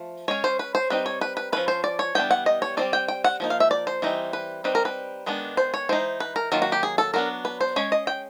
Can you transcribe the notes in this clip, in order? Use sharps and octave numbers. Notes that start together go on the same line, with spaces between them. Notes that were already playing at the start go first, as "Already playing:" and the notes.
Already playing: F3 A3
G#3 C#4 C#5
C5
B4
C5
G3 C4 D#4 B4
C#5
B4
B4
F3 G#3 C#4 B4
C5
D5
C#5
E3 G3 B3 D4 G5
F#5
D#5
C#5
G3 C4 D#4 D5
G5
G5
F#5
F3 A#3 D#4
F5
E5
D5
C5
E3 G3 C4 D#4
B4
G3 C4 D#4 B4
A#4
B4
D#3 G#3 B3 D4
C5
C#5
E3 G#3 D#4 C5
B4
A#4
D#3 F#3 A#3 F4
F#4
G4
G#4
A4
F#3 B3 D4 A#4
B4
C5
G#3 C#4 C#5
D#5
G5